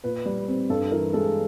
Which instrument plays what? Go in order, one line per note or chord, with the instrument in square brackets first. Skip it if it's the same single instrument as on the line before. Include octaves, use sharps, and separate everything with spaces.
[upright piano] A#2 B4
G3
C4
G2 A4
E3 A#4
G#3 A4